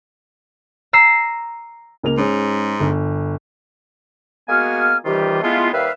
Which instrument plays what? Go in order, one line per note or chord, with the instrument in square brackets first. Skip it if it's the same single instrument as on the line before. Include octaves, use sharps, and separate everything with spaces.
[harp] A#5 E6 C7
[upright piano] C#2 A#3 F7
[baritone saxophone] G#2 [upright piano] G#3 C#4
[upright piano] G1
[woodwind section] G#3 A#3 B3 F#4 G#5 F6
C3 D#3 E3 G3 F4 G4
G#3 A3 B3 E4 F4
D#2 G3 B4 E5 F5